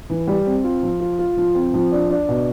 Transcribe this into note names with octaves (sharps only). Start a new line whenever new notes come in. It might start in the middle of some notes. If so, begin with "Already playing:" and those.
E3
G3
C4
F4
F3
F4
F4
F3
C4
F3
D4
D4
B2